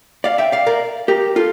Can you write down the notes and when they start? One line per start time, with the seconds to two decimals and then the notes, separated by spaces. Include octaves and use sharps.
0.24 D5 F5
0.38 E5 G5
0.52 D5 F5
0.67 A#4 D5
1.08 G4 A#4
1.36 F4 A4